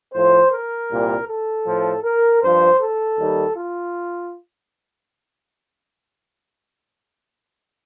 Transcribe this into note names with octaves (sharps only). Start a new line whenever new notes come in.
A2 F3 C5
A#4
C2 A#2 G3
A4
A2 F3
A#4
G2 F3 C5
A4
D#2 D#3 G3
F4